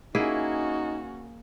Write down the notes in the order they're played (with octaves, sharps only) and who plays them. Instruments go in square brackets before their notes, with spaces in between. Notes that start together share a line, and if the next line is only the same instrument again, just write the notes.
[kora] A#3 E4 G#4 [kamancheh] C#4 F#4 [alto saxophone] D#4